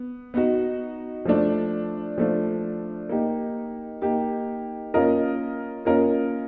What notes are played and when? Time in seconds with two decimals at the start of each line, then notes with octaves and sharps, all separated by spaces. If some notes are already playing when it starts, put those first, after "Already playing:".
Already playing: B3
0.34 B3 D#4 F#4
1.25 F3 A3 D4
2.18 F3 A3 D4
3.09 A#3 D#4 G4
4.02 A#3 D#4 G4
4.94 A#3 C#4 F4 A#4 D#5
5.85 A#3 C#4 F4 A#4 D#5